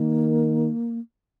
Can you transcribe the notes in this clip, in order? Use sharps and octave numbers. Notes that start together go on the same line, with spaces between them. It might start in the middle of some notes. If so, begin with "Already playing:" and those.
Already playing: D#3 A#3